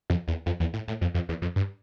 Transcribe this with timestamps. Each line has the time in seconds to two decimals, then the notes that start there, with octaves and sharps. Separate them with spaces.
0.10 F2
0.28 E2
0.46 F2
0.60 E2
0.73 A2
0.88 A2
1.01 F2
1.14 F2
1.29 E2
1.42 F2
1.56 G2